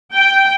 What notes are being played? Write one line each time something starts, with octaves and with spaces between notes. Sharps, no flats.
G5